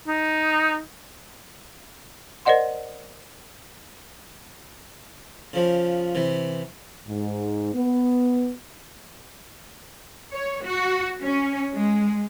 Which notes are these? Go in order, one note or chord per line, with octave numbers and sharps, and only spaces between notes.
D#4
A#4 C5 D5 D#5 F#5 C6
C#3 F3
C3 E3
G#2
B3
C#5
F#4
C#4
G#3